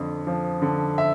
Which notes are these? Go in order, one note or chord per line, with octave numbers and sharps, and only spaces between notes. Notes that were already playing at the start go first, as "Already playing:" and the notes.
Already playing: F2 D3
F3
D3
E5